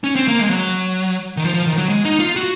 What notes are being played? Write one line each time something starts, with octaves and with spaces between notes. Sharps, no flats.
C#4
C4
A#3
G#3
F#3
D#3
F3
F3
D#3
F#3
G#3
D#4
F4
F#4